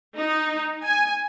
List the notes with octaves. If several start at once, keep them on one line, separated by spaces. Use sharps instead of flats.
D#4
G#5